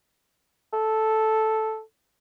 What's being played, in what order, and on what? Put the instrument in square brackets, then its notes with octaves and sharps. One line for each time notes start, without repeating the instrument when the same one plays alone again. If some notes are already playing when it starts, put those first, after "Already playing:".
[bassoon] A4